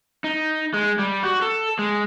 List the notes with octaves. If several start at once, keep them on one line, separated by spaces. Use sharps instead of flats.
D#4
G#3
G3
F#4
A4
G#3